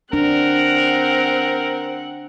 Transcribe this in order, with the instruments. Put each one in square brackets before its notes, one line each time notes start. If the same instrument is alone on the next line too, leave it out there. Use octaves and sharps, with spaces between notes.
[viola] C4 F#5 [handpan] D4 [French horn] A#4